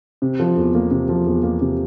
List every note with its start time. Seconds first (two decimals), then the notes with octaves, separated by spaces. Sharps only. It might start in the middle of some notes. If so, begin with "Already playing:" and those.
0.22 C3
0.40 F3
0.57 E2
0.75 A#3
0.91 C3
1.09 F3
1.26 E2
1.43 A#3
1.61 C3